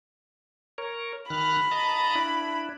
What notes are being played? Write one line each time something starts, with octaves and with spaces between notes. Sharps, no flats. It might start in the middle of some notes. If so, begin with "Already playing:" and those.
A#4 C#5
D#3 B5 F6 F#6
D#5 A5 A#5
D4 E4